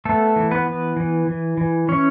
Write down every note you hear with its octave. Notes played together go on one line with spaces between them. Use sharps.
A3 B3 A4
E3
B3 B4
B3
E3
E3
E3
E3 C#4 C#5